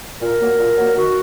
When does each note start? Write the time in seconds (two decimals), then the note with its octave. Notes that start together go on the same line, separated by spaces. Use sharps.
0.20 A#2 A#4
0.39 F#3 A#3
0.58 A#2
0.77 F#3 A#3
0.97 D#3 F#4